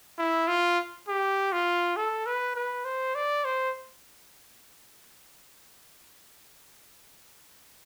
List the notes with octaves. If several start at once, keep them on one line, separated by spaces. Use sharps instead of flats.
E4
F4
G4
F4
A4
B4
B4
C5
D5
C5